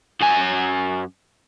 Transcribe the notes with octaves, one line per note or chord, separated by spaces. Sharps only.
F#2 G#5